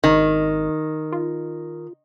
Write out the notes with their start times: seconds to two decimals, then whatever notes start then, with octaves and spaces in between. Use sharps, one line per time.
0.04 G#1 D#3
1.12 F4